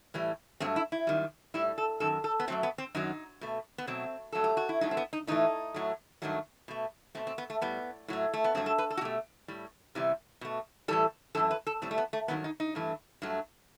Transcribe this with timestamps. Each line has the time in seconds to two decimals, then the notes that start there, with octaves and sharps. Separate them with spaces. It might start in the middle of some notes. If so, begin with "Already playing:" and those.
0.14 A2 E3 G3
0.60 G2 F#3 A3 C4
0.76 E4
0.92 E4
1.07 F#2 D#3 G3
1.54 A2 G3 E4
1.78 A4
2.00 F#2 D#3 A4
2.24 A4
2.40 B3
2.48 F#2 F#3 A3 C4
2.63 B3
2.78 C4
2.95 F#2 D#3 F#3 D#4
3.41 B2 A3
3.78 B3
3.87 B2 F#3 A3 C4
4.32 G2 F#3 A3 A4
4.44 G4
4.57 F#4
4.69 E4
4.81 G2 F#3 A3 D#4
4.91 C4
4.97 B3
5.13 D#4
5.27 A2 E3 A3 D#4
5.74 A2 F#3 A3
6.22 G2 D#3 F#3 A3
6.68 B2 A3
7.15 B2 A3 C4
7.27 C4
7.38 B3
7.50 A3
7.61 A2 G3 B3
8.08 A2 F#3 A3
8.33 A3
8.44 B3
8.55 G2 F#3 A3 C4
8.66 A4
8.78 B4
8.90 A4
8.97 F#4
9.01 B2 A3 G4
9.48 A2 G3
9.95 E2 C3 E3 G3
10.41 B2 A3
10.88 A2 E3 G3 A4
11.35 F#2 E3 A3 A4
11.51 B4
11.67 A4
11.82 A2 G3 C4
11.91 A3
11.98 B3
12.13 A3
12.28 G2 D#3 F#3 B3
12.44 D#4
12.60 D#4
12.75 G2 E3 A3
13.22 G2 F#3 A3